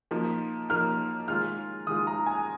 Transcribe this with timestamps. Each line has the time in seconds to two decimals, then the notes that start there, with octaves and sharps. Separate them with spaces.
0.11 F3 A#3 D#4
0.70 F3 A#3 D#4 F6
1.28 D#3 G#3 F4 F6
1.87 D#3 G#3 F4 D#6
2.07 A#5
2.26 G#5